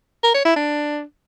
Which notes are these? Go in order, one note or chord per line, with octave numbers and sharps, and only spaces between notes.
A#4
C#5
E4
D4